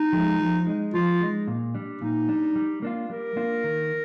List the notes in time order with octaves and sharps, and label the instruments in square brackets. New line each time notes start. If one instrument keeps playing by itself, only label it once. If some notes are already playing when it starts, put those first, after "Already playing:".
Already playing: [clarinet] D#4
[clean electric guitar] F3 G#3
F3
G#3 D#4
[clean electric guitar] F3 [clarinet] F4
[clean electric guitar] G#3 D#4
A#2
G3 D4
[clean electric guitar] A#2 [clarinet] D#4
[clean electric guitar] G3 D4
G3
A#3 D4 F4
[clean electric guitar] G3 [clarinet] A#4
[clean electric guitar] A#3 D4 F4
D#3